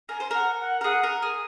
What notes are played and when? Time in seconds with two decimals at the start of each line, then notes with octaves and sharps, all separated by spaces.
0.09 A#4 G#5
0.20 C5
0.31 A#4 F#5
0.60 F#5
0.81 A#4
0.84 G#4 F#5
1.03 A#4
1.22 G#4